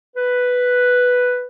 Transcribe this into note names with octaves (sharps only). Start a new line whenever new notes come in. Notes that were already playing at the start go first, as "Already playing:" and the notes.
B4